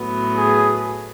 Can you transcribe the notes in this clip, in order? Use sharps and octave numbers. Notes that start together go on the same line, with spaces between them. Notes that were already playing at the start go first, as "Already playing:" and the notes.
Already playing: A2 F#3 B3
G#4